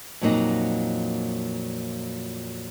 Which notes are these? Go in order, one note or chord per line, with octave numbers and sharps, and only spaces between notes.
F2 A#2 F#3 A#3 D#4